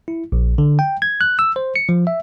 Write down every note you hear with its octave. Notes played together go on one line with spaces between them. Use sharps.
E4
A#1
D3
G5
G#6
F#6
E6
C5
C#7
F3
E5